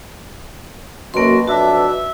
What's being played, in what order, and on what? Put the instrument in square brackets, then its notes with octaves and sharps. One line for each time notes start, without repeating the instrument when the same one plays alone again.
[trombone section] F#2 [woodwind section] B2 [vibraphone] A#3 C6 [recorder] F#4
[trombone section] F2 F#3 D4 [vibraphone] F#4 [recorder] E5